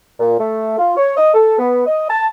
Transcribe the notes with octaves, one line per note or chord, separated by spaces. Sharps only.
A#2
A3
F4
C#5
D#5
A4
B3
D#5
A5